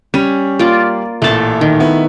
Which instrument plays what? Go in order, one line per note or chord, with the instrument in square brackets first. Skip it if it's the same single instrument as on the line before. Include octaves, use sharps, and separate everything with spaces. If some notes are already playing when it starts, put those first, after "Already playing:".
[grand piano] G3 D#7 [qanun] C#4
[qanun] A#3 F4 D5
[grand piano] A1 A#2 E4 [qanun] A3 A5
[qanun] D#3
[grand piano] B3 E4